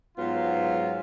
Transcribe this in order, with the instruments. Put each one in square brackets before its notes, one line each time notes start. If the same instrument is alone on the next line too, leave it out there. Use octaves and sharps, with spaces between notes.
[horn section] G#2 F#3 B3 F4